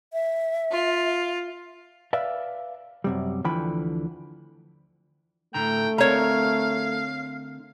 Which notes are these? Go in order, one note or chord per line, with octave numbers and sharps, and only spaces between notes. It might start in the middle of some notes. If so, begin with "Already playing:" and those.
E5
F4
B4 D5 E5 F5
F#2 C3 G3
D2 D3 E3 F3 G5 B5
A2 D3 A3 G5 A#5
D3 C4 A#4 C#5 F5 A#5